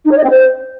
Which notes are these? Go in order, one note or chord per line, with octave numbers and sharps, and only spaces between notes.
D#4
C#5
D#5
C4
C5